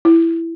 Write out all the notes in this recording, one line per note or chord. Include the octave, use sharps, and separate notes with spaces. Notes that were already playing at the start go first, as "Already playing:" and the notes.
E4